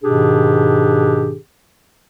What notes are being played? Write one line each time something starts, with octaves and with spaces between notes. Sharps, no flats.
G#2 B2 D#3 D4 G4 G#4